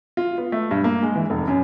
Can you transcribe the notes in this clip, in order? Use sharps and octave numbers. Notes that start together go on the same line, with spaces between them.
F4
B3
A3
G2
A#3
G#3
E3
F1
F#2